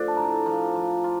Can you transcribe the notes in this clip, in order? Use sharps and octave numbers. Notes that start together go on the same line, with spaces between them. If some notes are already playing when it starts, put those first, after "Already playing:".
Already playing: F3 A3 D4
A5
A2 A#5
F3
F3
F4